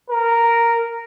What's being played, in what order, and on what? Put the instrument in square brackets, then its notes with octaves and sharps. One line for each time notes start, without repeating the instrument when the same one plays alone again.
[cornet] A#4